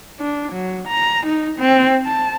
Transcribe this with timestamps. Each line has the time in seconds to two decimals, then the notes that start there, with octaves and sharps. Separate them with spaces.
0.20 D4
0.52 F#3
0.87 A#5
1.26 D#4
1.59 C4
2.05 A5